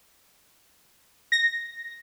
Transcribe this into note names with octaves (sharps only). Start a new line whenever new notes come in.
A#6